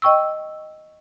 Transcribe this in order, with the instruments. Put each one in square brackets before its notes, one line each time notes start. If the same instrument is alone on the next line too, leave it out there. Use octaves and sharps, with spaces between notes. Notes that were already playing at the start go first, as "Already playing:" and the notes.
[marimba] D#5 G5 C#6 E6